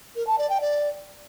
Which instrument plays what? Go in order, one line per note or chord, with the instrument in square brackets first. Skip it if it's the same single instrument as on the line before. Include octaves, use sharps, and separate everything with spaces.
[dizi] A#4
A5
D5
G5
D5